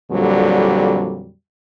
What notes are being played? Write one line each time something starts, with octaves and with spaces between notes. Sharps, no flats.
F2 A#2 D3 F#3 G3